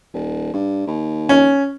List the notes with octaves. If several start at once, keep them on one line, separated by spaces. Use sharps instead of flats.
D#1
G2
D#2
C#4